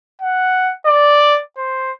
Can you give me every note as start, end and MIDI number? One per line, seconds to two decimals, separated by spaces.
0.22 0.72 78
0.86 1.39 74
1.58 1.91 72